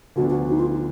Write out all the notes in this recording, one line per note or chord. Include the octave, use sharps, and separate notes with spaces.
D2 D3 F3 B3 D4 F#4
F#4
D#4
F4